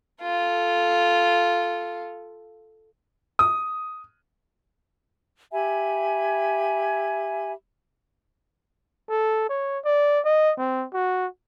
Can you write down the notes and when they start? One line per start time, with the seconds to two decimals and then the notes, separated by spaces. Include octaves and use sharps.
0.22 F4 A4
3.39 D#6
5.53 G4 E5 G#5 B5
9.10 A4
9.49 C#5
9.85 D5
10.25 D#5
10.58 C4
10.94 F#4